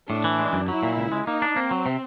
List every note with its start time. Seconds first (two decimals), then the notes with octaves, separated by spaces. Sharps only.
0.09 A2 D4
0.24 E3
0.39 G#3
0.53 F#2
0.68 F#3 E4
0.83 A#2
0.97 C#2
1.12 G#3
1.27 A#3 D#4
1.42 D4
1.56 A#3 C4
1.71 F#3
1.86 C3